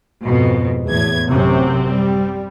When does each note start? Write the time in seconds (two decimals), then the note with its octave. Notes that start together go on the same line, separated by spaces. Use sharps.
0.23 F2 G#2 B2
0.86 E2 A2 G#6
1.31 A1 F#2 C3 C4
1.87 G3